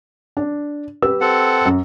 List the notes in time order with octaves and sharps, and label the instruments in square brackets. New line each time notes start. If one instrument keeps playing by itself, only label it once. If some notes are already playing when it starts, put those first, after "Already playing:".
[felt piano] D4
G4 B4 E6
[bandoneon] C4 A4 F#5
[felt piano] F#2